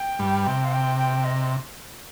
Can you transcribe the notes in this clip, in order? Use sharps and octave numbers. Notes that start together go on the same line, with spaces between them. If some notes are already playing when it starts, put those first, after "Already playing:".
Already playing: G5
G2 G3
C3 G5
F5
G5
G5
D#5